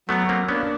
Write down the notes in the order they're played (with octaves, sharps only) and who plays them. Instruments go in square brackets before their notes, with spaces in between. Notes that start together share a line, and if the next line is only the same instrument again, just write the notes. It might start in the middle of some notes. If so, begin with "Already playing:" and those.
[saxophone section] F#3 [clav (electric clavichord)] A3 B3
[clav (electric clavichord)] A#3 C4
[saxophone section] A#3 D4 [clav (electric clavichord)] B3 C#4